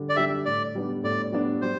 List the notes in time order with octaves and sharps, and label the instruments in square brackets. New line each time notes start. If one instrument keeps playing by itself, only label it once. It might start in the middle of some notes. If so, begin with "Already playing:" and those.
Already playing: [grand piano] D3 G3 D4
[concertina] D5
[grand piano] G3 D4 G4 [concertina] E5
[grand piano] A2 [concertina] D5
[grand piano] G3 B3 D4
[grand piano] A2 [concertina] D5
[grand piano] G3 B3 D4
[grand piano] G3 [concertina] C5